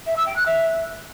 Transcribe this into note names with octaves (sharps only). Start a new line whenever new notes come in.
E5
E6
G5
F#6
E5